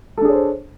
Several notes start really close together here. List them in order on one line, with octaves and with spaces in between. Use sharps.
A4 D4 G#4 C#5 C5